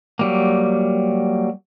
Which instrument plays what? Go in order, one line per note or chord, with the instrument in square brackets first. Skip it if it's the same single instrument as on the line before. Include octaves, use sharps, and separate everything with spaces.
[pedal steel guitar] F#3 G3 A#3